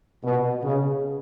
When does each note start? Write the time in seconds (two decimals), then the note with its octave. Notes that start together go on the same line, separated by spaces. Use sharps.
0.23 B2
0.63 C#3